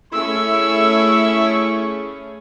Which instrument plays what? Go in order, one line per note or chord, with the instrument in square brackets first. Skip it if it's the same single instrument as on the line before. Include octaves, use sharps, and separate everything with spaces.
[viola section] A3 C#4 G#4 [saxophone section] E4 [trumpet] C#6 [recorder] E6